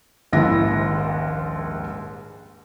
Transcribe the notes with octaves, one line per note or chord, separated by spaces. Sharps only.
D#1 A#1 D#2 G#2 E4 A#6